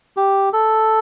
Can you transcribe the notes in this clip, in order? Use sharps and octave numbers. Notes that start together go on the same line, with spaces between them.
G4
A4